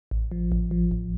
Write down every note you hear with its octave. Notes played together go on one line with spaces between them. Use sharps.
A1
F3
A1
F3
A1